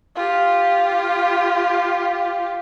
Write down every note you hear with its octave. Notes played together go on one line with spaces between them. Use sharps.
F4 G4